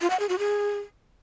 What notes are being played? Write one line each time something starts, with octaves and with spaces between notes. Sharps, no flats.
F4
F#5
G#4
F#4
G#4